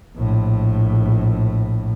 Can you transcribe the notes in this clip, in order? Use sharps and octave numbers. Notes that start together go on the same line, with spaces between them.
A#1 A2